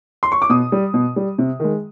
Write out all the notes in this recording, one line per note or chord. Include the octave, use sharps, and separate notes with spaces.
C6
C#6
D6
B2 D#6
G3
B2
G3
C3
D#3 G#3